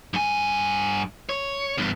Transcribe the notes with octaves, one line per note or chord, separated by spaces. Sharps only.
G2 G#5
C#5
E2 G2